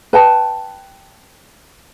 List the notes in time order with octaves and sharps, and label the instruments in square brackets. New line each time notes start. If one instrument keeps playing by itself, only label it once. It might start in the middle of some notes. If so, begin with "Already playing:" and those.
[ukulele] B4 G5 A5